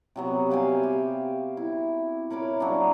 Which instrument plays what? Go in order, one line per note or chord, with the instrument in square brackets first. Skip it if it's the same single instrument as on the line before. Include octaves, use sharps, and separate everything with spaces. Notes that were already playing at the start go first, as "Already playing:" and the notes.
[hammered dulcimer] C3 F#3 B3
E5 F5 G5 G#5
G4 C5
E4
A#4 C#5 B5 D6
F#3 A#3 D4